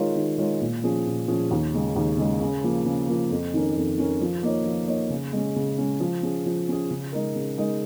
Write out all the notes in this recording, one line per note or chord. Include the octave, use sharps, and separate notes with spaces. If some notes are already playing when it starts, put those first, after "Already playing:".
Already playing: D#3 G#3 F4 A#4 C#5
D#3
G#3 F4 A#4 C#5
A#2
F3 C#4 G#4
A#2
F3 C#4 G#4
D#2
C#3 G#3
D#2
C#3 G#3
C#3
F3 A#3
C#3
F3 A#3
F2
D#3 C#4 A#4
F2
D#3 C#4 A#4
F3
A#3 D#4 C#5
F3
A#3 D#4 C#5
C#3
G#3 C#4
C#3
G#3 C#4
F3
C#4 G#4
F3
C#4 G#4
C#3
G#3 D#4 A#4
C#3
G#3 D#4 A#4